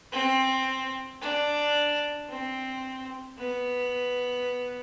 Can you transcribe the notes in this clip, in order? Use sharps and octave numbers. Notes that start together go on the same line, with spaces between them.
C4
D4
C4
B3